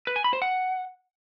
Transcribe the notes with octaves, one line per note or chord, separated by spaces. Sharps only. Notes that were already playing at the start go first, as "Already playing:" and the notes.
B4
G#5
B5
C5
F#5